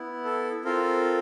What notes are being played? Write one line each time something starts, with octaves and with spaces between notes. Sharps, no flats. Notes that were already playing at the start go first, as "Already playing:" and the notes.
Already playing: B3 E4
A4
C4 F4 A4 A#4